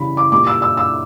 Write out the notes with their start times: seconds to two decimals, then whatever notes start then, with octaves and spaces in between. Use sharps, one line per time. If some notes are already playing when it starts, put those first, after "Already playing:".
Already playing: C#3 E3 G3 B5
0.17 D6
0.32 A#2 G3 D6
0.47 E6
0.62 E6
0.77 E6